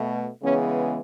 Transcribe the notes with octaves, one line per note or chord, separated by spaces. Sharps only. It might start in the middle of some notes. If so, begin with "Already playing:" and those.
Already playing: B2 A3
C#3 E3 G#3 B3 C#4